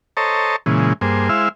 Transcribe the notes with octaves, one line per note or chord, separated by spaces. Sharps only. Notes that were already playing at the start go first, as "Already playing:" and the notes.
A4 C5 C#5 D#5 A5 A#5
A#2 C#3 E3 G#3
G2 A#3 G#4 C5
G#3 E4 C5 E5 F5